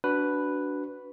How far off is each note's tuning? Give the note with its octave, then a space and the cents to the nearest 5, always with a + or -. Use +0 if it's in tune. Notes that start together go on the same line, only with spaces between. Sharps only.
D4 -15 F#4 +5 B4 +0